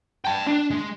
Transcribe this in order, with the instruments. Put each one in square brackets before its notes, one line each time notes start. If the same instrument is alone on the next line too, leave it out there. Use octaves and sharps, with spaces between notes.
[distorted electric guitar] G5 A5
D4
G#3